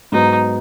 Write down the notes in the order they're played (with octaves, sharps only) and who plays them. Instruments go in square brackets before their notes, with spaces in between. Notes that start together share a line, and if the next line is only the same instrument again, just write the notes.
[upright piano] G#2 F#3 B3 [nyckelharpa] D#4